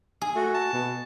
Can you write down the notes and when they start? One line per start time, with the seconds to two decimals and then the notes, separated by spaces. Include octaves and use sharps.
0.22 G#4
0.36 A3 F#4
0.54 A5
0.73 B2